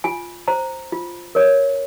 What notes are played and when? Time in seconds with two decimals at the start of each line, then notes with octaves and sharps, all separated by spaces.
0.04 F4 G#5
0.48 C5 A#5
0.92 F4
1.35 A#4 C#5